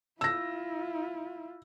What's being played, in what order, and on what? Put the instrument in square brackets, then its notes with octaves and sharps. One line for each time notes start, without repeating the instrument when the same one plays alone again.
[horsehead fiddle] E4 F4 [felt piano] E6 A#6